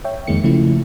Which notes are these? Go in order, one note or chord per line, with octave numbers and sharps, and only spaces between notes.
C#5 E5 G5
F2 D#3 G#3 A#3 C#7
C#3 F3 A3 E4